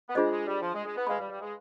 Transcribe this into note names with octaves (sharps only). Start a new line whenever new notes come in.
B3
G#3 D4 F4 G#4 C5 D#5
G#3
G3
F3
G#3
G#3
B3
G#3 B4 F5 B5
G3
G3
G#3